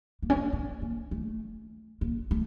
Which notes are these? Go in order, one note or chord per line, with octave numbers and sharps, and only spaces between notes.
A#3
C#4
A#3
C#4
A#3
A3
A#3
A3